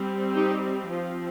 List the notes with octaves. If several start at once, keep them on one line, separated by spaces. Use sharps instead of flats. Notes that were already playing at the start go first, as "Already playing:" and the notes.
Already playing: G3 C4
D#4 G4
F3 C4 F4